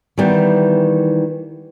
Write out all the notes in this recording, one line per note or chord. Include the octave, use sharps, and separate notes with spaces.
D#3 E3 G3 B3